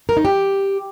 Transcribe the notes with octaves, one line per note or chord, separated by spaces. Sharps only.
A#4
D#4
G4